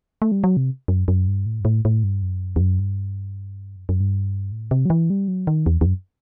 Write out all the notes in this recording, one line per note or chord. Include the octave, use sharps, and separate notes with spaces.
A3
G3
F#3
C3
F#2
F#2
G2
A2
G2
A2
A2
G2
F#2
E2
F#2
G2
F#2
F#2
G2
A2
C3
F#3
E3
G3
F#3
D#3
E2
E2
F#2